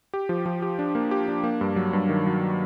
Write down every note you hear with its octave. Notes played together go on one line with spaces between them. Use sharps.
G4
F3
F3
G4
D4
A#3
G4
D4
A#3
G2
F#3
G2
D#3
F#3